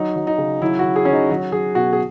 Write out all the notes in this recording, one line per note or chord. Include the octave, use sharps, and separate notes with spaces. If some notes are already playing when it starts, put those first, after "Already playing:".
Already playing: F#3 D#4
F#3
D#4
C#3
F#3 E4
F#3 F#4
G#4
F#3 C#4
D#4
F#3 F#4
F#3 G#4
B2 F#4
G#4